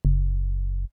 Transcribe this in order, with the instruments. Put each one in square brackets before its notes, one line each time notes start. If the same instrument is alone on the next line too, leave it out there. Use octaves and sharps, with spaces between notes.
[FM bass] F#1